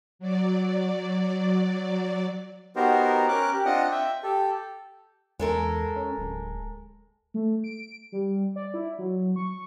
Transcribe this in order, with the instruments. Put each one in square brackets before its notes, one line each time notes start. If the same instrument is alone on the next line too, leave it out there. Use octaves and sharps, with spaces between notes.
[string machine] F#3 D5
[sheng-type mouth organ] B3 D#4 F#4 G4 A#4 C5
C#4 A#4 D6 F#6
G4
C4 D4 F4 D#5 F#5
E5 G5
G4 A4
[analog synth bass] E2 [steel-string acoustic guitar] G#3 A4 A#4
[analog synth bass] C#4
D1
[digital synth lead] A3
D7
G3
D5
E4
F#3
C#6